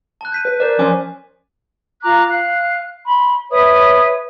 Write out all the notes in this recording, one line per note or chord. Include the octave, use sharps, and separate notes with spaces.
A5 F#6
G6 B6 D#7
B4
A#4 C5 D5
F3 C#4 C#5 G#5 D6
F4 A#5 D6 F#6
F5 F#6
B5 C6
B4 C#5 E5 D#6